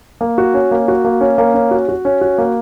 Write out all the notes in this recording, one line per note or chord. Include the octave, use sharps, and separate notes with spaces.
A#3
F#4
C#4
A#3
F#4
A#3
C#4
A#3
C#4
F#4
F#4
C#4
F#4
A#3